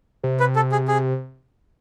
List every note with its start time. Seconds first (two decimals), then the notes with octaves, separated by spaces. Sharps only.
0.24 C3
0.40 B4
0.56 A4
0.72 G#4
0.88 G#4